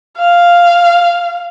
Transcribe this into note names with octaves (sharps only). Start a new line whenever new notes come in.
F5